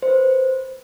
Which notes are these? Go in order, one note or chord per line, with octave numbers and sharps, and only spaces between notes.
C5
B4
C5